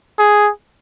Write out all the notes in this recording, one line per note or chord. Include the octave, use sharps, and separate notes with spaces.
G#4